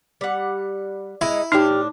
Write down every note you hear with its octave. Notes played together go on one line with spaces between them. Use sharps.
G3 F#5
G#3 D#4 E4
A2 D4 D#4 G4 A5 F6